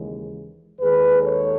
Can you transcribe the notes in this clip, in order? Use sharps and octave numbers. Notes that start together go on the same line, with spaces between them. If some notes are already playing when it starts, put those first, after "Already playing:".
Already playing: D#2 C#3 E3 G#3
D#2 D#3 G#3 G#4 B4
A4 C#5